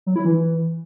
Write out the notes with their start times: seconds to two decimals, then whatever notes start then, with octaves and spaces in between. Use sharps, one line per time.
0.06 F#3
0.16 E4
0.25 E3